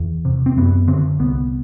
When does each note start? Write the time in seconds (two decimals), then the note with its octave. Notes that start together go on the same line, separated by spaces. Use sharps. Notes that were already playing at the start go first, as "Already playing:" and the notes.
Already playing: E2
0.25 C3
0.46 C4
0.57 F#2 B3
0.88 D3 C4
1.19 C2 B3